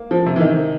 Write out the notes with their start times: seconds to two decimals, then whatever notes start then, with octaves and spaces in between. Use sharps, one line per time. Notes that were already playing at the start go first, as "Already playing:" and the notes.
Already playing: A#3
0.11 F3
0.26 C3
0.36 E3
0.40 D#3